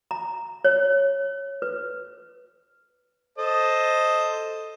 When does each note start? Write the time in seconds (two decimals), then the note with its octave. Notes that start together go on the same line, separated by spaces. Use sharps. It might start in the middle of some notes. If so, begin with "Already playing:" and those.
0.11 A#5
0.65 C#5
1.62 B4
3.38 A4 C5 D#5